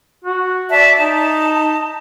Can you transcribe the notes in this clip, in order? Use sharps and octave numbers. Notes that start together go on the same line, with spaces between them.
F#4
D5 E5 A5
D#4 A5